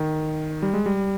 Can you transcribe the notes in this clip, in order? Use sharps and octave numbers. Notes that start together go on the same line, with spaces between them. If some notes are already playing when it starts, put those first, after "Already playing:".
Already playing: D#3
G3
G#3
G3